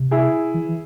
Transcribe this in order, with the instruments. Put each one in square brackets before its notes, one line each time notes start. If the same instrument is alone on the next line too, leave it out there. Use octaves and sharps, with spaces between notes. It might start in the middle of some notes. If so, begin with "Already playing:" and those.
Already playing: [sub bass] C3
[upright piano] E4 G#4
[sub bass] E3